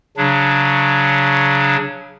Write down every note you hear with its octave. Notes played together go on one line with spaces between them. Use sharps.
C#3 F#3 D4